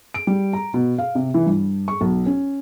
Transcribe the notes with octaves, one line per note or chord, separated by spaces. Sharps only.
D7
G3
A#5
B2
F5
C3
E3
G2
C#6
B1
C#4